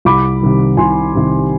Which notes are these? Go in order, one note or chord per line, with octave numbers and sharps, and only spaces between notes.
C2 B5 D6
C3 D#3 G3
C2 G#5 C6
C3 D#3 G3